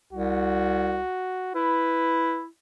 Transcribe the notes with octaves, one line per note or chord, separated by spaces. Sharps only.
C2 F#4
E4 B4